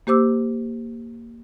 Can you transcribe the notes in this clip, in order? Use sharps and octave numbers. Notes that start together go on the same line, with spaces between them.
A#3 G4 C5 D6 E6